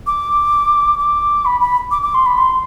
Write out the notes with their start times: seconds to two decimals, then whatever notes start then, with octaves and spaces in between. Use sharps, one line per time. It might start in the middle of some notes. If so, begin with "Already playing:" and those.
0.07 D6
0.99 D6
1.45 B5
1.61 B5
1.91 D6
2.02 D6
2.14 C6
2.26 B5
2.38 C6